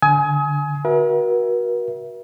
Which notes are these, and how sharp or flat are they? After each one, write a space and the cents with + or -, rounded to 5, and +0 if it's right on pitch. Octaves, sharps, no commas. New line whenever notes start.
D3 +0 G#5 +20 D#6 +35
F#4 +0 A#4 +45 E5 +5